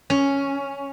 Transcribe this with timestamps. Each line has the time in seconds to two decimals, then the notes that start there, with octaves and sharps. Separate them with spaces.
0.10 C#4